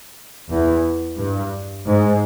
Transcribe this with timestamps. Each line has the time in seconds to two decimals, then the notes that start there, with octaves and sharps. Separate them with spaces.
0.50 E2
1.19 G2
1.86 G#2